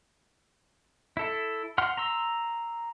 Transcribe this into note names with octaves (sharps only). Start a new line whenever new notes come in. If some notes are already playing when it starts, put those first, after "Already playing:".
E4 A4
F#5 C6 F6
A#5 C6 E6